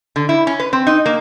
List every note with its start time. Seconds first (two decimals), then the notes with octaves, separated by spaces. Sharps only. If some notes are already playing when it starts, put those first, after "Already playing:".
0.16 D3
0.29 E4
0.47 C#4
0.59 B4
0.73 C4
0.87 D#4
1.06 A#3